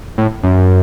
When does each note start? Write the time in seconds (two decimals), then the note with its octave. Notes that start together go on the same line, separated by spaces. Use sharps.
0.18 A2
0.43 F#2